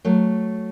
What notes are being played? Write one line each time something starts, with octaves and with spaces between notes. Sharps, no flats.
F#3 A3